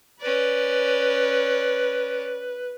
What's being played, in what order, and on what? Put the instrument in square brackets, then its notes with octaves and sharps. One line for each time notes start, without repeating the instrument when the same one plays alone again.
[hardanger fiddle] C#4 D5 [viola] B4